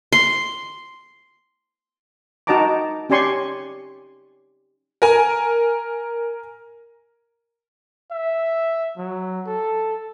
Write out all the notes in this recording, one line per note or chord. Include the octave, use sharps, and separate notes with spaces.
C6
D#4 F#4 D#5 A5 A#5 D6
C#4 G4 D5 G#5 C6 C#6
A#4 G#5
E5
F#3
A4